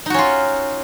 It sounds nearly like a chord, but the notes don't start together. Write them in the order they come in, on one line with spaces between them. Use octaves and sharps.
D#4 F#4 C#4 F4